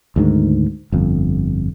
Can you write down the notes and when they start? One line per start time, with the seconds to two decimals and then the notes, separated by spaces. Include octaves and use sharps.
0.16 D2 G#2 D#3
0.92 G1 F2